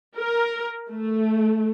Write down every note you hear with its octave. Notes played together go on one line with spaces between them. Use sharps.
A#4
A3